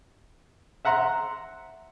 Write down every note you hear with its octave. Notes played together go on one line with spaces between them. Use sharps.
E5 F#5 A#5 C6